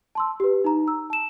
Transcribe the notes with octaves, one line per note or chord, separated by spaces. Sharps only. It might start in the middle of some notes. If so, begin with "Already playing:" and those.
A5 C6 E6
G4 B4
D#4 A#5
E6
A5 E7